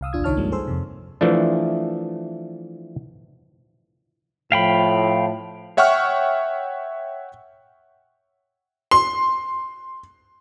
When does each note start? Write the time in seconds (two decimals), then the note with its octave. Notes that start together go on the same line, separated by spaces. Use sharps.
0.01 C2 F5 D#6 E6
0.13 A1 D#2 D4 F4 D#6 G#6
0.24 C#2 D#3 D#4 C#5 A5 F6
0.37 G2 F3 G3 G#3 A#3
0.52 G#4 A4 C5 C6 E6
0.67 F2 C3
1.21 E3 F3 A3 D4
4.52 A2 F3 F5 G5 B5
5.77 C#5 E5 F#5 G5 C#6 F6
8.91 C6